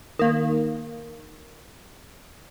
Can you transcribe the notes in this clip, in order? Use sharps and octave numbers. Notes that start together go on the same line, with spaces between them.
D#3 A#3